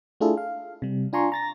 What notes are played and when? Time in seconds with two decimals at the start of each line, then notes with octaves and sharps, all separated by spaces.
0.21 A3 D4 E4 F4 G#4 A4
0.37 F5
0.82 C3 G3
1.13 D4 F4 G#5 A#5 C6 C#6
1.32 A#5 A6 A#6